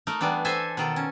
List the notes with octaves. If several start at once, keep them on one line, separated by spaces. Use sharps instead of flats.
A3 D#4 A#4
E3 G3 B3 D4
A4 C5 E5 G#5
B2 D#3 A4
C#4